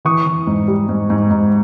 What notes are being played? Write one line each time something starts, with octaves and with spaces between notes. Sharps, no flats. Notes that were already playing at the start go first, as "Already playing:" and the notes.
E3 C#6 D#6
E3
G#2
G3
G#2
G#2
G#2